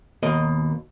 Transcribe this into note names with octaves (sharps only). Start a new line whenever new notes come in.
D#2 B2 A#4 D#5